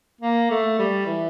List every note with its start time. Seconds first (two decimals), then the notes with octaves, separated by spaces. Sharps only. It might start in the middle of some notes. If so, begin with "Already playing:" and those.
0.21 A#3
0.50 A3
0.79 G3
1.06 E3